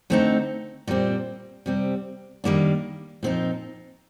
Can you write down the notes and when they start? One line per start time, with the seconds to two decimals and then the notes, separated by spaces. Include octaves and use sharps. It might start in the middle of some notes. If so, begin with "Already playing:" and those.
0.10 D3 A3 C4 D#4
0.87 A#2 G3 C4
1.66 C3 G3 C4
2.44 D#3 G3 A#3 D4
3.23 A#2 F3 C4 D#4